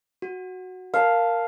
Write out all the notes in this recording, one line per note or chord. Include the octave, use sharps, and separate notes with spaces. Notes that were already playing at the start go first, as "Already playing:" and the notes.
F#4
A#4 F5 A5